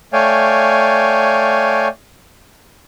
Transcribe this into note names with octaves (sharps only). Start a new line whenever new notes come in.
A3 C#5 D5 F5 G5 G#5